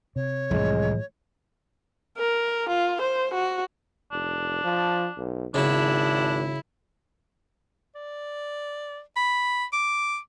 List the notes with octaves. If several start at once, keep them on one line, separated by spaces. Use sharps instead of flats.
C3 C#5
C2 F2 A2 E3 F3 G#3
A#4
F4
C5
F#4
F1 D4
F3
B1
G#1 C#3 F#3 D4 E4
D5
B5
D6